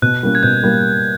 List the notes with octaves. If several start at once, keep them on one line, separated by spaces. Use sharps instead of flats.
B2 F#6
G3 A#3 C#4
G#6
B2 G6
G3 A#3